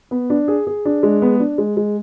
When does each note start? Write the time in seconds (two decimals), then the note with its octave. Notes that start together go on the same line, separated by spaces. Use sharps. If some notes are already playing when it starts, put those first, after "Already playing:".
0.11 B3
0.30 D4
0.48 G#4
0.67 G#4
0.85 D4
1.03 G#3
1.22 B3
1.40 D4
1.58 G#3
1.77 G#3